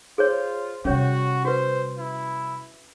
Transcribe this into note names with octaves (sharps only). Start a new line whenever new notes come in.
F4 G#4 C5 C#5
C3 G3 C#4 F#4 C#5
F#4 B4 C5
E4